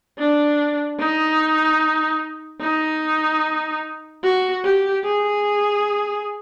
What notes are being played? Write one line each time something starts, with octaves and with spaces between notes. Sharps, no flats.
D4
D#4
D#4
F#4
G4
G#4